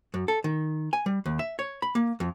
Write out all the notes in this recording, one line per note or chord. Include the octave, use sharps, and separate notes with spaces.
F#2
A4
D#3
G#5
G3
D#2
E5
C#5
B5
A#3
F2